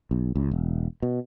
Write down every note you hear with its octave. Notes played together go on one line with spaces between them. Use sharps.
B1
C#2
E1
B2